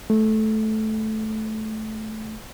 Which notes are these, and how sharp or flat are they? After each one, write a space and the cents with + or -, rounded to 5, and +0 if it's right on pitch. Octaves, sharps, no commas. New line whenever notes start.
A3 -15